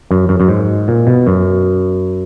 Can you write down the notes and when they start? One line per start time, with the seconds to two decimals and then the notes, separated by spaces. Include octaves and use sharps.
0.11 F#2
0.29 F#2
0.40 F#2
0.49 G#2
0.88 A#2
1.07 B2
1.27 F#2